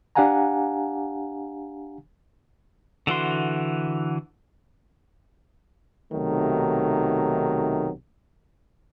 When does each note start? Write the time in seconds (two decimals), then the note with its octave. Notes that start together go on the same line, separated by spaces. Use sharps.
0.15 D4 G4 F5 F#5 G#5 A#5
3.07 D3 E3 F#4 C6
6.13 B1 C3 D#3 F#3 A3